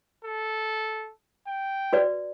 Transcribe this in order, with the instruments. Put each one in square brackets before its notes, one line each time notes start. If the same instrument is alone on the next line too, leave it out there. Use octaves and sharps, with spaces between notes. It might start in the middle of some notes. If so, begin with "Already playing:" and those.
[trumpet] A4
G5
[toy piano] F#4 B4 D5